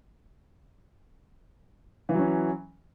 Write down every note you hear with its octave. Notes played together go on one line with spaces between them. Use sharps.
E3 F#3 C#4